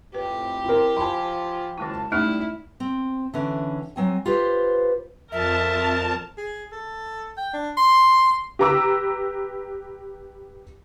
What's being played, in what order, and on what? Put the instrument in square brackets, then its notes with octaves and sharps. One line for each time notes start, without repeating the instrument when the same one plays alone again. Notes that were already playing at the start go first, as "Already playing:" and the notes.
[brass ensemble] F2 A2 [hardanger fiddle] G4 [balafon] B4
[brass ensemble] C4 [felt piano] E4 A#4
[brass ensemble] F3 [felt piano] G#5 B5 [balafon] A5 C6
[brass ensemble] F#1 F4 A5 [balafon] D#3 G#3 E4
[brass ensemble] A2 G3 [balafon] A3 C#4 D#4 [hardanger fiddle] E4 [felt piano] F6
[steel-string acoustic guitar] C4
D3 E3 C#4
F#3 C4 G#5
F4 G4 B4 C5
[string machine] F2 A5 [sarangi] A#4 [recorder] E5
[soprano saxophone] G#4
A4
G5
D4
C6
[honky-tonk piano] G4 B4 A#5 D6 E6